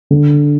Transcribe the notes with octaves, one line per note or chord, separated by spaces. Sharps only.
D3